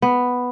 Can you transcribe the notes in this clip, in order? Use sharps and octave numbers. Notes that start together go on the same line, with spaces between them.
B3